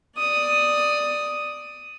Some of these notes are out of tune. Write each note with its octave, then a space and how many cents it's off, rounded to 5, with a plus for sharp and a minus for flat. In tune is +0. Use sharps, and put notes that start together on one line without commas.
D5 +10 D#6 +0